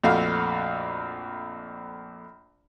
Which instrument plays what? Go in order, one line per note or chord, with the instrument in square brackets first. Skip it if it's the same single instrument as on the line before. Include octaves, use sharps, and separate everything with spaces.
[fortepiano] A#1 F2 A3 F#4 F5